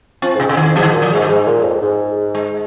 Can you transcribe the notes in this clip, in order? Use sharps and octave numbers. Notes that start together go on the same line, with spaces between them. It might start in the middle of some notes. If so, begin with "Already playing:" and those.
F3 C4
G#2 C3
F2 C3
D#3
F2
G#2 F3
D#3
A#2 F3
F3
G#2 G#3
F3
G#2 G#3
A#2
F2
G#2
G#3